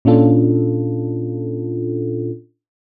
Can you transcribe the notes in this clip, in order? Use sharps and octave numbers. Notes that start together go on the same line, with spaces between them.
A#2 C#4 D4 F4 A4